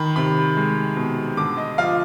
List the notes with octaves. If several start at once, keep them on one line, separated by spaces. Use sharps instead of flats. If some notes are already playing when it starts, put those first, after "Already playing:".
Already playing: D#3 B5
C3 B5
G#3
B2
D3 D6
D#5
F3 F5